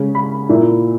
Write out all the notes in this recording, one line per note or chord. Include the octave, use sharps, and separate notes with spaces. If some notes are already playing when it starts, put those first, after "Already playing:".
Already playing: C#3 G#3 C#4
B5
A#2 A#3 E4